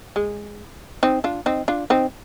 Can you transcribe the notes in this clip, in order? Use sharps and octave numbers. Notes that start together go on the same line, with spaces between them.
G#3
C4 D#4
D4 F4
C4 D#4
D4 F4
C4 D#4